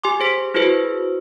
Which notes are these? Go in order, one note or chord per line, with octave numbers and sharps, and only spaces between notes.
G4 G#5 C6 D6
G#4 C5 B6
E4 F#4 G#4 B4 C5